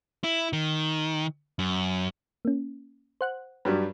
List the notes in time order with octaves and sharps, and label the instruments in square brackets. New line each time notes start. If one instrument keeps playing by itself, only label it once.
[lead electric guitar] E4
D#3
F#2
[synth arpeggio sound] A#3 C#4
C5 F#5 F#6
[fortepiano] G2 F#3 G3